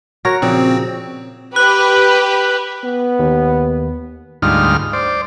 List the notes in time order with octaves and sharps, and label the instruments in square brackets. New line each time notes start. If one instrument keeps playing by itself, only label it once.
[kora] F#4 A#4 C#5 [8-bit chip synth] A#6
[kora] A#2 C#3 F3 [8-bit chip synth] C4
[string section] G4 B4 [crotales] F#6
[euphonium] B3
[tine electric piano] D#2
[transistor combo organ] D2 G#2 G3 D#4 F4 F6
C5 D5